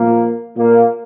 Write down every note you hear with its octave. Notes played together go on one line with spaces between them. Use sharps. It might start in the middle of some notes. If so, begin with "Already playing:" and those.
Already playing: A#2 F3 A#3
A#2 A#3